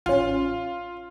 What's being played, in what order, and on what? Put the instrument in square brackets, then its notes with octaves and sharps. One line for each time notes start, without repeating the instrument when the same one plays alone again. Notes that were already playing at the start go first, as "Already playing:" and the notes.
[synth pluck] A1 C#4 [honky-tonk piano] F4